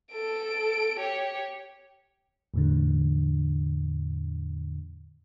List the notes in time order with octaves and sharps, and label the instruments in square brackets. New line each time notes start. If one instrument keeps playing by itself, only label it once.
[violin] A4 D7
G4 C#5
[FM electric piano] E2 A2 D3